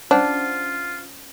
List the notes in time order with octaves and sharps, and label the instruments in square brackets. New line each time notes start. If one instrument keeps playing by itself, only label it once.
[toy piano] C#4 C5 F#5 [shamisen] D4 [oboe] F4